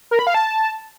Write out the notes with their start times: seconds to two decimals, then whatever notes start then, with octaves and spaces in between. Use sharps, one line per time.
0.11 A#4
0.19 B5
0.27 F5
0.34 A5